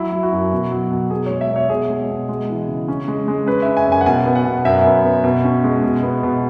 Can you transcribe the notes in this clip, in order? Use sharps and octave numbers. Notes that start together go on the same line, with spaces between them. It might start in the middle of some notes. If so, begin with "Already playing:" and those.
Already playing: F#3 E4
F#3
F#4
F#2
B2
F#3
B2
B2 G#4
G#3 C#5
E5
B2 C#5
B2 G#4
G#3
B2
G#3
E3
C#3
C#4
G#3
G#3
C#4 B4
C#4 E5
G#5
F#2 G#5
F#5
B2 G#5
B3
F#5
B2
F#2 E5
B3
B3
B2
C#4
G#3
B2
B3
B2